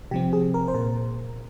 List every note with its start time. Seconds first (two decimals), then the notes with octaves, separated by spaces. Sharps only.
0.11 C3 F3 C4 G4
0.33 G#4
0.54 A#4
0.68 C5
0.74 A#2 A#4